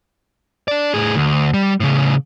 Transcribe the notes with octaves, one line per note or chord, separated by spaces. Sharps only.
D4 D5
A2 G#4
D2
G3
A2 C#3